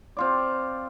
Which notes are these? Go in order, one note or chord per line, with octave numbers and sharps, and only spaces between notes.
C4 F4 D5